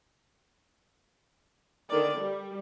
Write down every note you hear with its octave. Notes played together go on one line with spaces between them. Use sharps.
D3 D#3 A#4 D5
G3